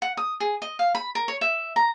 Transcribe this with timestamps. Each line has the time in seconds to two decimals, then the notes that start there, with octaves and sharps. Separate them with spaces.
0.02 F#5
0.17 D#6
0.40 G#4
0.62 D#5
0.79 F5
0.95 B5
1.15 A#4
1.28 C#5
1.41 E5
1.76 A#5